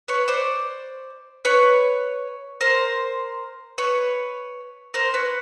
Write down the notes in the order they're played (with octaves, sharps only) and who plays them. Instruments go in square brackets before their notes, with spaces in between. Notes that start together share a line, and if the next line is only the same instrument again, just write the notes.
[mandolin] B4 C#5
C5 D5
B4 C#5
A#4 C5
B4 C#5
A#4 C5
B4 C#5